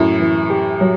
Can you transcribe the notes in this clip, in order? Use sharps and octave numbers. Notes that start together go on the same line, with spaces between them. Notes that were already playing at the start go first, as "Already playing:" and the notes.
Already playing: F#2 A2 E4
E3
G4
F#3